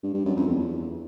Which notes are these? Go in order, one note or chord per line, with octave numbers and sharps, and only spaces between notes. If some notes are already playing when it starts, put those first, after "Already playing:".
G2
G2
F#2
F2
E2